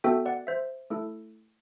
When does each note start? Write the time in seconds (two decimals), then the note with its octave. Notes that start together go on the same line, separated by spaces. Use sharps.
0.04 B3 F#4 A4 E5 G5
0.26 D5 F#5
0.47 C5 E5
0.90 A3 E4 A4